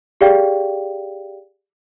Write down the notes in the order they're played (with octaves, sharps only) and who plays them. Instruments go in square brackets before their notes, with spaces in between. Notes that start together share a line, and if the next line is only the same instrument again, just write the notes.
[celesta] G4 G#4 D5 F5 G5